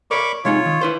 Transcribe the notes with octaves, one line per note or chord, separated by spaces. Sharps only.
A#4 C#5 D5 B5 C#6 D6
C3 G#3 D#4 F4 C#5
D#3
E4 B4 C5